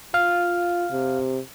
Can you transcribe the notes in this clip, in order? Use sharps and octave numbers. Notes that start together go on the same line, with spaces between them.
F4 F5 F6
C3